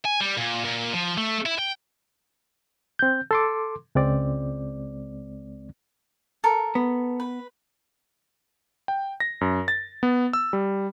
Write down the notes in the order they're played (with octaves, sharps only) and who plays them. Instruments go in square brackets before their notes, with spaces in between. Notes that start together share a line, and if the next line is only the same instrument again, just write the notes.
[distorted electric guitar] G#5
G3
A#2
A#2
F3
A3
E4
G5
[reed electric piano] C4 G6
A4 C6 D6
C#2 G#3 C4 D5
[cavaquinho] A4 A#4
[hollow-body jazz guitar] B3
[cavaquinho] B4
[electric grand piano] G5
A#6
F#2
A6
B3
E6
G3